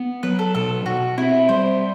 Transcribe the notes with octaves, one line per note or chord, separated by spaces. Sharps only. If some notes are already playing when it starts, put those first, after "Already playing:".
Already playing: B3
F#3 B4
A4
B2 A4
B2 F#4
C4 E4
G3 C5